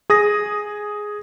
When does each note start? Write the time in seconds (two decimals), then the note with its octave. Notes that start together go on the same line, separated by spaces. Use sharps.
0.10 G#4 D#6 A#6